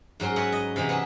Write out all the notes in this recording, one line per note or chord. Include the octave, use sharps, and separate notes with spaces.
G#2 F#3 C#4 A#4 C6
F#4 B4 C#5 D#5 E5 F#5
D#5
C3 E3 F#3 D#4
B3 C#4 E5